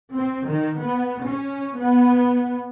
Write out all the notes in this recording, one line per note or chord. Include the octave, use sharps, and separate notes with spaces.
C4
D#3
B3
C#4
B3